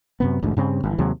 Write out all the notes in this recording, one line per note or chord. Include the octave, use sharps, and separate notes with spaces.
F#2 C3 B3
A1 D2 G#2
G2 C#3 C4
G1 E3
D#2 C3 F#3 G#3